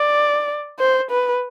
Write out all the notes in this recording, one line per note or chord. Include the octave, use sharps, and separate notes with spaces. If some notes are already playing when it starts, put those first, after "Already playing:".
Already playing: D5
C5
B4